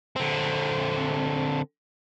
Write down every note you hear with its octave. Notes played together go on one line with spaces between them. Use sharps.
D3 C4